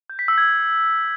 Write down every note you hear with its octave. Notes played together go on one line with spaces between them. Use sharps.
G6
B6
E6
G#6